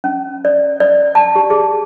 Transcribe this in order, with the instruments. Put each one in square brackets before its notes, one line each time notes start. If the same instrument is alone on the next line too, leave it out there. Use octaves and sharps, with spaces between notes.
[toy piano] C#4
D5
D5
A5
G4
G#4